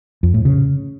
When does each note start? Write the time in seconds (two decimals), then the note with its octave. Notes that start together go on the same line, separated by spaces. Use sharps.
0.23 F2
0.34 A2
0.45 C#3